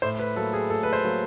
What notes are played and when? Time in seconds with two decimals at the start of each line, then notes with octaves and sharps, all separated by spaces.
0.02 A2 C5
0.19 B4
0.36 F#3 A#3 A4
0.53 G#4
0.70 A2 A4
0.83 B4
0.93 C5
1.04 F#3 A#3